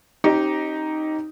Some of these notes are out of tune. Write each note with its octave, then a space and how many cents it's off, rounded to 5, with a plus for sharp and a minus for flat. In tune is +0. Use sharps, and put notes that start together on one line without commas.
C4 +45 D#4 +0 G4 -15